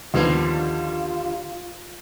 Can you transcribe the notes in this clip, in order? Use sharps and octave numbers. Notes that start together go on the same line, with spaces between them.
D#2 D3 F3 G3 A#3 B3 F4